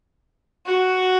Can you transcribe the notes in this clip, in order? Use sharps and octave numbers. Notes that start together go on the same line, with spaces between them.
F#4